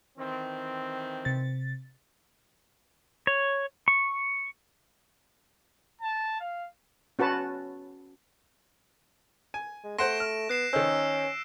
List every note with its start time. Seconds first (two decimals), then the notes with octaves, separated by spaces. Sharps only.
0.18 D#3 E3 C4
1.25 C3 A6
3.27 C#5
3.88 C#6
6.01 A5
6.40 F5
7.19 C#4 F#4 B4 A5
9.54 G#5
9.84 G#3
9.99 A3 C5 F#5 C6 A#6 D7 E7
10.20 F6
10.49 B3 F#6 C7 E7
10.73 D#3 C#4 D#4 C5 E6